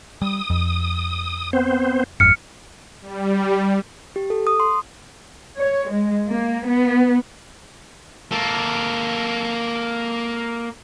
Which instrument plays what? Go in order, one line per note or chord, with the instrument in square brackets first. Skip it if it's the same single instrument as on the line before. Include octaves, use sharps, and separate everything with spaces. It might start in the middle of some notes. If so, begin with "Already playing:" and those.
[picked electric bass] G3 [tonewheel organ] D#6
[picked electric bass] F2
[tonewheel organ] B3 C4 C5
[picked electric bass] G#1 F2 G#2 [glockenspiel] F6 C#7
[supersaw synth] G3
[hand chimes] G4
A4
D#6
C6
[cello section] C#5
G#3
A#3
B3
[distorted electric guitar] A#3 A4